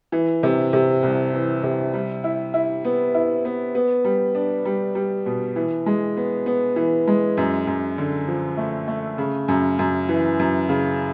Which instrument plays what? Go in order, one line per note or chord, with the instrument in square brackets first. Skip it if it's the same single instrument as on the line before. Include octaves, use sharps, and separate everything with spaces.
[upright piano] E3
C3
C3
C2
E3
C3
G3
E4
E4
B3
E4
B3
B3
G3
D4
G3
G3
B2
E3
G#3
B3
B3
E3
G#3
F#2
F#2
D3
F3
A3
A3
C#3
F#2
F#2
E3
F#2
C#3